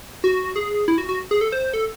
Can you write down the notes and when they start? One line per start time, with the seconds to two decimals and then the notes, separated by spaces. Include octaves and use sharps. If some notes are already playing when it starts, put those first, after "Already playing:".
0.24 F#4
0.56 G#4
0.88 E4
0.98 F#4
1.09 F#4
1.31 G#4
1.41 A4
1.52 C5
1.74 A4